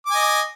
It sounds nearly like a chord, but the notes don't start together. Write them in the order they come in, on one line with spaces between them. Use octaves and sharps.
D6 G#5 D#5